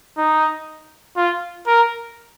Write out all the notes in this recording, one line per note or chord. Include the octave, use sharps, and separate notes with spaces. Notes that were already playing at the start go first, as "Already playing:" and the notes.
D#4
F4
A#4